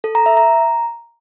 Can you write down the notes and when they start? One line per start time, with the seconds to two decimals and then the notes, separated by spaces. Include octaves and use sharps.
0.04 A4
0.15 A#5
0.26 E5
0.37 A#5